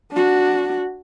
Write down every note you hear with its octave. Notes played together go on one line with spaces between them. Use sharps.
D4 F#4